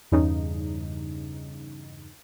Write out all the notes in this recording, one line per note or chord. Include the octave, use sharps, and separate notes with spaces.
E2 G2 C#3 D#4